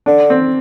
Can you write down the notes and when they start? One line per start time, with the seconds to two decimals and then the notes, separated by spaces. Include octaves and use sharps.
0.06 D3 D4
0.30 C4